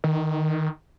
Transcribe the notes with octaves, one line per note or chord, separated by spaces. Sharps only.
D#3